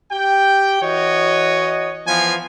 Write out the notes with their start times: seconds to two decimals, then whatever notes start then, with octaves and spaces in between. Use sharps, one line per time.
0.12 G4 G5
0.82 E3 F#4 C#5 D#5
2.07 E3 F3 B3 F5 G#5